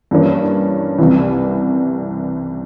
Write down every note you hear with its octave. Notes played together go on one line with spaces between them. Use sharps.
G2 E3 A#3 C#4
C2 C3 E3